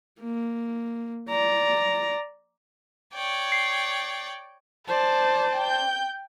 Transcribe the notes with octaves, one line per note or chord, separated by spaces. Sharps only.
A#3
D5 A#5
C#5 D5 G5
C7
C5 D5 A5
G5 G6